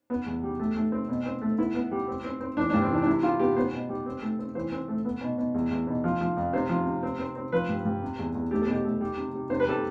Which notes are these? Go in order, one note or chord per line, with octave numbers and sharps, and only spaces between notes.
B3 B4
E2
G3
A3
A3
C4
B2
C4
A3
B3 E4
B3
G3
C4
C4
C4
E3 D4
G2 D4
C4
E3 D4
D4
C3 E4
G3 F4
B3 G4
B3 C5
B2
G3
C4
A3
C4
E3 C5
C4
A3
B3
B2
B2
E2
E2
B2
F3
F3
F2
C3 C5
F3
C3
C4
C4
C4
F3 B4
G2
G2
C3
E2
E2
A3 G4
A4
B2 G4
A3
G3
C3
G3
C3 C5
B4
G3 A4